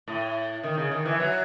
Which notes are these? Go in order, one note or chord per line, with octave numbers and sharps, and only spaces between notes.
A2
D#3
C#3
D#3
E3
F#3